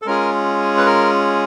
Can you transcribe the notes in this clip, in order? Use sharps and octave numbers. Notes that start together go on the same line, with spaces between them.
A4
G#3 C#4 F4 G#4 A#4
B4
A#4